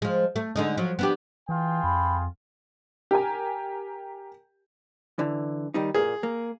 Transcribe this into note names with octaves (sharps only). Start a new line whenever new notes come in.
F3 G#3
A3
D3 G#3 D#4
F3 F#3
B3 D4 G4
E3 F4 G#4 G5
F2 B5
G4 A#4 G#5
D3 E3
D#3 G3 D#4
A#2 A#3 G#4
A#3